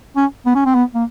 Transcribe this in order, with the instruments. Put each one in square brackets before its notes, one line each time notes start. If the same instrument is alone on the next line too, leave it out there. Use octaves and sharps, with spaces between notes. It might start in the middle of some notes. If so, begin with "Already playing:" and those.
[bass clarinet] C#4
B3
C#4
C4
B3
A#3